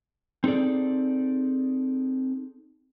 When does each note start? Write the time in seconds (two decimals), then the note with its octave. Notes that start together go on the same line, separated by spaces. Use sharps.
0.44 C4 D#4 G#4 A4 D5